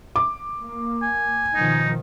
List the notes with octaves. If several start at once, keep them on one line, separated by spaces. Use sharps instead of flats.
D6
A#3
G#5
B2 D#3 F3 D#4